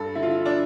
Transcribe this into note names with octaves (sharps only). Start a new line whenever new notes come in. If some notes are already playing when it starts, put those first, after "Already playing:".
Already playing: G2 A4
D3 E4
F4
E4
D4